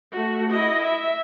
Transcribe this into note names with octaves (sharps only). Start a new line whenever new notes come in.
A3 F#4
E4 D#5
E5